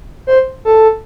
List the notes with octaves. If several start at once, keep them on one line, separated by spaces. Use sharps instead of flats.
C5
A4